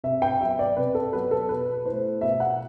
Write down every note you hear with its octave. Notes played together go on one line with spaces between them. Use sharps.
C3 E5
G5
F#3 B3 E5
D5
C3 B4
A4
F#3 B3 B4
A4
B2 B4
A3 E4 C5
B2 E5
F#5